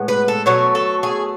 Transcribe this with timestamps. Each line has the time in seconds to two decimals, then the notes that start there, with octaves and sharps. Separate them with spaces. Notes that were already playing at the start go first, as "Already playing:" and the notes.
Already playing: A2 G#3 B3
0.08 B4
0.28 A4
0.46 B2 F#3 A3 C#5
0.75 A4
1.03 G#4